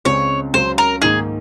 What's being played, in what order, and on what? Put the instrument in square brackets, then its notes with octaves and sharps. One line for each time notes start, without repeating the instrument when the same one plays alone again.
[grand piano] C#2 C#3 G#3 C4 [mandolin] C#5
[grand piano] C#2 C#3 F#3 [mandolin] C5
[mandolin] A#4
[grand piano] G#2 D#3 A#3 D#4 [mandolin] G#4